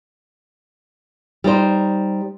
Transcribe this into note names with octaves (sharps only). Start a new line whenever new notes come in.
G3 D#4 C5